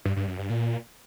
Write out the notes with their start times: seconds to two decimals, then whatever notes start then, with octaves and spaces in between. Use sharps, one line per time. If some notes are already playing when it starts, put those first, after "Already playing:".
0.05 G2
0.16 G2
0.27 F#2
0.39 G2
0.50 A#2